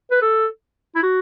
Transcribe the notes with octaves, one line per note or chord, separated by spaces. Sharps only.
B4
A4
E4
F#4